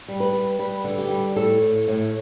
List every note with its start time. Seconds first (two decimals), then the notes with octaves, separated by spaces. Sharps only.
0.08 G3
0.20 B4
0.33 G3
0.59 G3 B4
0.84 D3
0.98 G4
1.10 G3
1.36 A2 A4
1.62 A2
1.88 A2